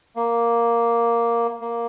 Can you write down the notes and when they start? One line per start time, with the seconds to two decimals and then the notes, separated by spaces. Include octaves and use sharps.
0.16 A#3
1.61 A#3